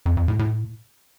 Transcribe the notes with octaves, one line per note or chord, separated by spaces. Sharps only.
F2
F2
A2
A2